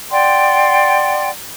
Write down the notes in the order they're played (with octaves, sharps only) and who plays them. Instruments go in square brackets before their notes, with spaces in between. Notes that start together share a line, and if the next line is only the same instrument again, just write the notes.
[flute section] D5 F#5 G5 C6